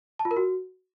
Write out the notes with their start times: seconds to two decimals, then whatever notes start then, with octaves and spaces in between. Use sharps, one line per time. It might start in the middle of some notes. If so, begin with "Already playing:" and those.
0.19 A5
0.25 F4
0.31 A#4
0.37 F#4